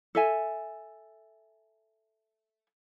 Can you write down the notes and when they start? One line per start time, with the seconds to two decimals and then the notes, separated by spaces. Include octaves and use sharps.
0.15 A4 E5 G#5